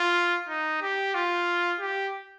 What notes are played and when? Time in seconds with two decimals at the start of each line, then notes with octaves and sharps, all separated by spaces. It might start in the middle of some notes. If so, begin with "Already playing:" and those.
Already playing: F4
0.48 D#4
0.82 G4
1.14 F4
1.80 G4